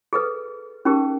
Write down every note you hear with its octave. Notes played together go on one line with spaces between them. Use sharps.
G#4 A4 B4
C#4 D#4 G4 G#4 A#4